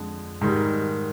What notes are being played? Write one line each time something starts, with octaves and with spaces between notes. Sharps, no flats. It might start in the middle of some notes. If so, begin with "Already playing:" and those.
Already playing: F2 D3 G#3
G#2 D#3 G3